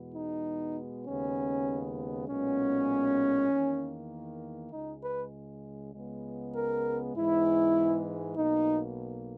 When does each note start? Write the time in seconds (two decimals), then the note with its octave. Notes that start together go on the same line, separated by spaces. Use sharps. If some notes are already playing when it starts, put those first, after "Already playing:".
Already playing: E2 B2 G#3 B3
0.14 D#4
1.06 D#2 C#3 G#3 B3 C#4
2.28 B1 A#2 G#3 B3 C#4
3.50 E2 D#3 A#3
4.71 C#2 C#3 G#3 D#4
5.02 B4
5.93 C#2 C#3 G#3 B3
6.54 A#4
7.15 G#2 E3 G#3 B3 E4
8.37 B1 B2 A#3 D#4